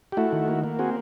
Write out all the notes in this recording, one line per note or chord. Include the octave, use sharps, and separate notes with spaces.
G4
A3 E4 F#4
D#3
A#3
A#3
C4 F#4 G#4